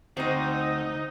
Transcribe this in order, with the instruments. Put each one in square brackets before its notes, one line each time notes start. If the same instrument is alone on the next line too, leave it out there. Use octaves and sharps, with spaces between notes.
[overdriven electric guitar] D2 [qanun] C4 C5 [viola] D#4